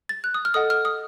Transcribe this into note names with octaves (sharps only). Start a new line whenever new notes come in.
A6
F#6
D#6
F6
A4 D#5 F#5 D#6
F6
D#6